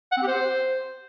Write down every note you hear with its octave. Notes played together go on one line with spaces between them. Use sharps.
F#5
C4
G4
C5